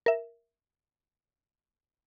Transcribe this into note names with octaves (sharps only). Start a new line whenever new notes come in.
A#4 E5